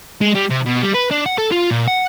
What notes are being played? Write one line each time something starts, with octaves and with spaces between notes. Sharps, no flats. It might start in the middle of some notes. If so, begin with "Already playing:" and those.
G#3
G3
C3
B2
G3
B4
D4
F#5
A4
F4
A#2
F#5